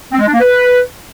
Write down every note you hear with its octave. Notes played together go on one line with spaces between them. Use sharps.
C4
G#3
D4
A#3
B4